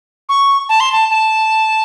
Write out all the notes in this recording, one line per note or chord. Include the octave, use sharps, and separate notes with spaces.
C#6
A5
C6
A5
A5